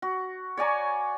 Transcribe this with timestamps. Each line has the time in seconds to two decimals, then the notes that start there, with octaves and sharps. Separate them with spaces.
0.02 F#4
0.57 C#5 D5 G#5 A#5